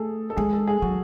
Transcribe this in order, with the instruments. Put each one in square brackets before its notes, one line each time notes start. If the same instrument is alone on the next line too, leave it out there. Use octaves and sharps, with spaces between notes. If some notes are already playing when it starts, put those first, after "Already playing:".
Already playing: [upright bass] A3 [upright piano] G#4 A4
[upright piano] A4
[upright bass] G#3 [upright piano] G#4
[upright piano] A4
G#4
[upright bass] F#3 [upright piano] F#4